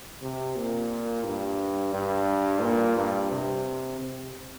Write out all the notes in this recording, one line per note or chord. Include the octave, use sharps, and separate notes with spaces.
C3
A#2
G2
G2
A#2
G2
C3
C3